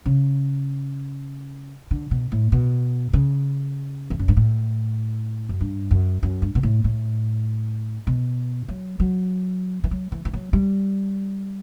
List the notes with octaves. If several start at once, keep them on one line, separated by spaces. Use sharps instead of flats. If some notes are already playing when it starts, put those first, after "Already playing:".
C#3
D3
B2
A2
B2
C#3
E2
F#2
G2
A2
F#2
G2
F#2
F#2
G2
B2
A2
A2
B2
F#3
F#3
E3
F#3
E3
E3
F#3
G3